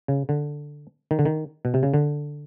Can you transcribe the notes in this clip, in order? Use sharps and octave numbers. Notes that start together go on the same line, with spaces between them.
C#3
D3
D#3
D3
D#3
B2
C3
C#3
D3